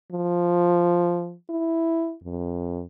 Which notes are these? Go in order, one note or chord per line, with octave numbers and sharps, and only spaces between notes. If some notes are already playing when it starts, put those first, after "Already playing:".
F3
E4
F2